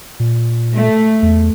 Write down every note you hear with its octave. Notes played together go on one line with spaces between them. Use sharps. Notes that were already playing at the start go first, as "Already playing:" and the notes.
A#2
A3
E2